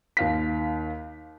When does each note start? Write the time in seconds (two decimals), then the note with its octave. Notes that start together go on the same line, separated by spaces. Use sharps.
0.17 D#2 F5 B6